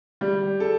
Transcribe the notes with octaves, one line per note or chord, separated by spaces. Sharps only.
G3
A4